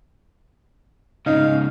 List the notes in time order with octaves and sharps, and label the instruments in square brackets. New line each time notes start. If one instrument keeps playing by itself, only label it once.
[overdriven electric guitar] G#2 C#3 [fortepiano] D#4 [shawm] F5